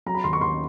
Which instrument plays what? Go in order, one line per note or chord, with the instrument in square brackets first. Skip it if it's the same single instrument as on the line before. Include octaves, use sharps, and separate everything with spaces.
[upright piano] F#3 A#5
B5
D#2 C6
C#6
D#2 C6